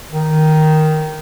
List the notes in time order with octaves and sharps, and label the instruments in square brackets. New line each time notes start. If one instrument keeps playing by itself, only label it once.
[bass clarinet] D#3